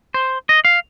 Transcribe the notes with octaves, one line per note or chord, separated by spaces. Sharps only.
C5
D#5
F5